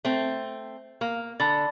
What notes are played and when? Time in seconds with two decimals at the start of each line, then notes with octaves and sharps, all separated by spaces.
0.05 A3 C4
1.01 A#3
1.40 D3 A5 B5 A6